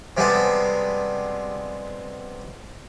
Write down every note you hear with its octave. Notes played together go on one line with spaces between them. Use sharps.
C3 G3 G#3 B3 A4